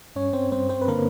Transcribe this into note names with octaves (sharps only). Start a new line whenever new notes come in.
G2 C#4 C#5
C4 C5
G2 C4 C5
C4 C5
B4
D3 A#3 A#4